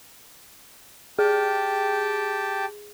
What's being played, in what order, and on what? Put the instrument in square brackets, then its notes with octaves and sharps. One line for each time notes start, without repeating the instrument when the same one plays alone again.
[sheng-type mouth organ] G4 G5 A5 [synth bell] G#4